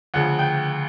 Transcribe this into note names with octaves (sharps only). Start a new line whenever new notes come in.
D2 C#3 F3 F#5
G5